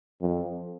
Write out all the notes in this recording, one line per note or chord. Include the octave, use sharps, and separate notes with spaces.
F2